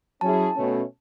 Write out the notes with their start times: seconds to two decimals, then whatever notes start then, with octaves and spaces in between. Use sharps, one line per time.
0.21 F#3 C#4 E4 G#4 A5
0.55 B2 A3 C#4